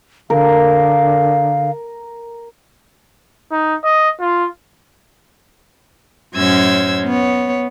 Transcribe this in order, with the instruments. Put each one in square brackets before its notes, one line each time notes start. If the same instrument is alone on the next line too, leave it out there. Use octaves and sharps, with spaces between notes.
[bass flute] D3 [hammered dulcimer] A#4 [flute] F5
[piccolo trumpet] D#4
D#5
F4
[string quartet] F#2 A2 C#4 C5 E6 G#6
B3 C#5